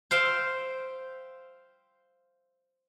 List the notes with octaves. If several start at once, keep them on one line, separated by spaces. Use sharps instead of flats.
C5 E5 F5 G5